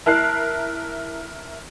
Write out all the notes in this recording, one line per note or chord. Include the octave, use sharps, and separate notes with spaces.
E4 A#4 A5 F#6 C7